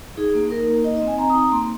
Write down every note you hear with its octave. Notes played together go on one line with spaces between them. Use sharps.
D#4 G#4
A#3
D#4 A#4
A#3
D#4 D#5
D#5
C4
G#5
C4 A#5
D#6
D#4
A#5
A#3 C6